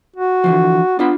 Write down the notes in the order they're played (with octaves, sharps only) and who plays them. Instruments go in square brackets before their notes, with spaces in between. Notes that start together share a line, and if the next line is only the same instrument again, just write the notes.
[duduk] F#4
[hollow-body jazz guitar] D3 E3 F3
[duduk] B3 [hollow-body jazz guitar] D4 F4 B5